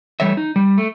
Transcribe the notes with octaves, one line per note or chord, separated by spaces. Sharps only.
E3 G3 A3 C#5 E5
D#4
G3
A3